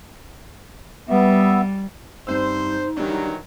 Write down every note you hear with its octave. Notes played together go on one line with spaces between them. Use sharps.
G3 B3 E5
G2 C4 D#4 C5 E6
D#3 E3 F#3 G3 D4